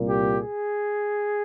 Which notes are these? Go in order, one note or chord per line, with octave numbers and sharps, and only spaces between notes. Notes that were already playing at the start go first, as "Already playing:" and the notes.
Already playing: C2 A#2
G4
G#4